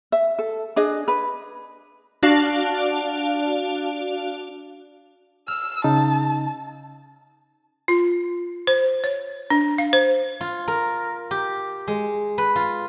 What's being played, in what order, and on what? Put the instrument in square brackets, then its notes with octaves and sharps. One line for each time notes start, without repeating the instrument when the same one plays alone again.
[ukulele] E5
A4
D4 G#4 D#5
B4
[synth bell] D4 F#4 D5 F5 A5
[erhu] E6 [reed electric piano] F6
[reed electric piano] C#3 D#4 [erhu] A5
[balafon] F4
C5
C#5
D4
F5
C5
[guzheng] F4
A#4
G4
G#3
B4
F4